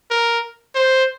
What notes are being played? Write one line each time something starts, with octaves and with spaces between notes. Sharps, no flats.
A#4
C5